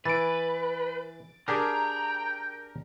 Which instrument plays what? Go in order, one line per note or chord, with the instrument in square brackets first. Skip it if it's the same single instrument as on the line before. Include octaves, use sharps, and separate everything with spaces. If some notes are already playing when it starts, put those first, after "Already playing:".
[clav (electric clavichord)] E3 [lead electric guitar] B4 [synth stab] A6 D7
[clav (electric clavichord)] D4 G4 G#4 [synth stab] A#4 [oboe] G5 [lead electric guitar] A#5